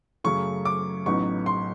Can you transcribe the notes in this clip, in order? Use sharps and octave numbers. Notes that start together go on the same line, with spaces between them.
F#2 C#3 F#3 A3 C#6
D6
A1 A2 F#3 B3 D#4 C#6
C6